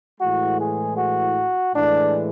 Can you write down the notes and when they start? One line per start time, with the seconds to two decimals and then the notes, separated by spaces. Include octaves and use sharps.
0.20 A2 E3 G#3 F#4
0.59 G#4
0.97 F#4
1.75 A2 E3 G#3 D4